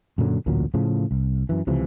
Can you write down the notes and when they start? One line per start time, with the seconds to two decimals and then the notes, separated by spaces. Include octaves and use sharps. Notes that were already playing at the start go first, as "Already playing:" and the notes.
0.18 F#2 A#2 D3 F#3
0.46 A1 D2 A#2 F#3
0.74 A2 C#3 F3
1.11 C2
1.49 F#2 E3
1.67 C#2 C3 E3 F3